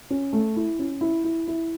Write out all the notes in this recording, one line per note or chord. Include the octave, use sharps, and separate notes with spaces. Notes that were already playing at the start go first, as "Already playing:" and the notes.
C#4
A3
E4
C#4
E4
E4
E4